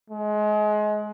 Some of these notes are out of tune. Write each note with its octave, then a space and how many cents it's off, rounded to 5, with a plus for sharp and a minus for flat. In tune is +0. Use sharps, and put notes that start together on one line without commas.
G#3 +25